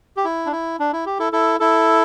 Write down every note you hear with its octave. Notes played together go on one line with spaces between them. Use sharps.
G4
E4
D4
E4
D4
E4
G4
E4 A4
E4 A4
E4 A4